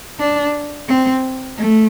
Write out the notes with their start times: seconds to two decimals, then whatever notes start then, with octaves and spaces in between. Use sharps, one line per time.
0.19 D4
0.88 C4
1.58 A3